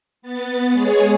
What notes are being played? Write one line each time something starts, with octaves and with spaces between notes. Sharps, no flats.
B3 A6
G#3 G#4 C#5